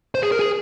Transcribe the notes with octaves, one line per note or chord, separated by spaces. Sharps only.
C5
G#4
A#4
G#4